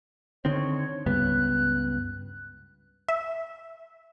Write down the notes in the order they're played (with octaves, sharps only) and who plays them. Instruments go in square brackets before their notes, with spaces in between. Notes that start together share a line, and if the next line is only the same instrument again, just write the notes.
[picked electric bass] D3 D#3 C4 [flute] C#5
[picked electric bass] C#2 G2 B3 [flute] F#6
[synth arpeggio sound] E5